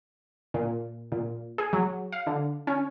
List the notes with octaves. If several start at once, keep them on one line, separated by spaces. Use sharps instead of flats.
A#2
A#2
G#4
F#3
F5
D3
C#4